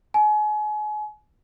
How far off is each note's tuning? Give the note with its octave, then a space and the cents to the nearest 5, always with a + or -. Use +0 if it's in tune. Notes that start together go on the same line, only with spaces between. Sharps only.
G#5 +35